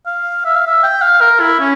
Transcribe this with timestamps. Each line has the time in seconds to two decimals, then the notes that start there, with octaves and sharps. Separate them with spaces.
0.06 F5
0.45 E5
0.55 F5
0.67 E5
0.83 G5
1.02 F5
1.21 A#4
1.40 E4
1.60 C#4